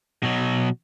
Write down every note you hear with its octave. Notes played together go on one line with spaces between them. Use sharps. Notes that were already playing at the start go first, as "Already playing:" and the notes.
B2 F#3